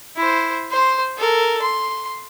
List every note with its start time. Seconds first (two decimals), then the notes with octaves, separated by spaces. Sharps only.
0.16 E4 C5
0.71 C5 C6
1.17 A4 A#4
1.62 C6